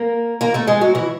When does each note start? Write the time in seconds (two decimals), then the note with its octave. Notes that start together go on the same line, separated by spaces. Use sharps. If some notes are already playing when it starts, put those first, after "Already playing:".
Already playing: A#3 A#4
0.41 A#3 A#4
0.54 A3 A4
0.67 G#3 G#4
0.81 F#3 F#4
0.95 E3 E4